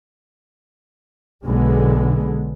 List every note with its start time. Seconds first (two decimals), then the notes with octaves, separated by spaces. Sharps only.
1.44 B1 D3 G#3 B3